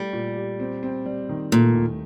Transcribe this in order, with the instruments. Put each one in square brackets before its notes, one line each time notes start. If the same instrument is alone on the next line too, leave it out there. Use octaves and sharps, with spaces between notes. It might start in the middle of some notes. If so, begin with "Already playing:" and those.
Already playing: [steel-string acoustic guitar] G3 [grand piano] A3 G4
[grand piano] A#2
G4
C4
C4
G3
D#3
[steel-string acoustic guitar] A#2 [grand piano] A3
[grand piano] D#2